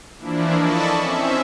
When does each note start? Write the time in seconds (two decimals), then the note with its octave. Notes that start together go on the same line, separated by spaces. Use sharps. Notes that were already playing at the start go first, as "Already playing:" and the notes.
0.18 E3 F3 A#3 D4 E4
0.56 A4 D5 D#5 A5 B5 C#6
0.95 C4 C#4 E5